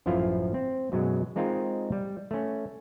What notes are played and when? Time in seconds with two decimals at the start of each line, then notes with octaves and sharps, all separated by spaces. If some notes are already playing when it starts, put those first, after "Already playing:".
0.06 A1 F#2 F3 E4 F4 F5
0.54 C4
0.92 F#2 B2 F#3 G#3
1.36 G#3 C4 D#4 F4 A#4 G5
1.92 G3
2.31 A3 C#4